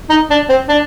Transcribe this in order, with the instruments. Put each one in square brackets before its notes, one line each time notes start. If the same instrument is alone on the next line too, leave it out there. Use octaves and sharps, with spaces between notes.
[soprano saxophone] D#4
D4
C4
D4